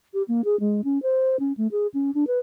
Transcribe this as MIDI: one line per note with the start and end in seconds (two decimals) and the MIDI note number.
0.14 0.23 67
0.28 0.41 58
0.45 0.59 68
0.60 0.81 56
0.84 1.01 61
1.03 1.37 72
1.39 1.53 61
1.57 1.67 57
1.72 1.87 68
1.94 2.11 61
2.14 2.25 62
2.27 2.39 71